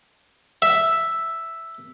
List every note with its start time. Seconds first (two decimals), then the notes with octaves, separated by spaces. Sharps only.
0.62 E5